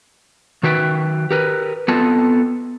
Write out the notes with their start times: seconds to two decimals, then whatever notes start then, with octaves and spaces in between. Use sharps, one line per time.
0.63 D#3 F#4 B4 E5 G5
1.31 G4 A#4 B4
1.88 B3 C4 F4 A4 D#5 A5